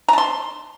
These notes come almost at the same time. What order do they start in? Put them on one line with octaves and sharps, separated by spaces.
A#5 A5 C6